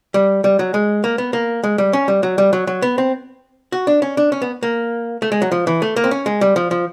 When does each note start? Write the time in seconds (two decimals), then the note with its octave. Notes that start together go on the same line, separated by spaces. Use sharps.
0.14 G3
0.44 G3
0.59 F#3
0.74 G#3
1.04 A#3
1.18 B3
1.33 A#3
1.64 G#3
1.78 G3
1.93 C#4
2.08 G3
2.23 F#3
2.38 G3
2.53 F#3
2.67 F#3
2.82 B3
2.98 C4
3.72 F#4
3.87 D4
4.02 C#4
4.17 D4
4.32 C#4
4.42 B3
4.63 A#3
5.22 A3
5.32 G#3
5.42 F#3
5.52 F3
5.67 E3
5.82 A3
5.96 A#3
6.04 C4
6.11 C#4
6.26 G#3
6.41 G3
6.56 F3
6.71 F3